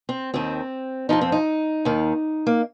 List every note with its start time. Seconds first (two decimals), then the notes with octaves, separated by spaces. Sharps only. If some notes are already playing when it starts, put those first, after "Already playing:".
0.09 C4
0.34 D#2 D#3 C4
1.09 F2 F3 D#4
1.21 C4
1.32 D#4
1.85 D#2 D#3
2.47 A#3